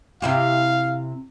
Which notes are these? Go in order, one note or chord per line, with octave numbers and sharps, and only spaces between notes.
C3 E4 G4 F5